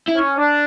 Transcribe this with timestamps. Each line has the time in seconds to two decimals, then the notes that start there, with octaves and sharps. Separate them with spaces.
0.09 E4
0.15 C#4
0.38 D4